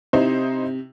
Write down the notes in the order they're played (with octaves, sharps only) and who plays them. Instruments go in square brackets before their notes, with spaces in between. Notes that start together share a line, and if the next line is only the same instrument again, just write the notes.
[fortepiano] C3 [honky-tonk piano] D#4 E4 C5